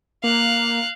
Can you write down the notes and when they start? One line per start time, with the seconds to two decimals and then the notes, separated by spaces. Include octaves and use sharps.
0.24 A#3 F5 F#6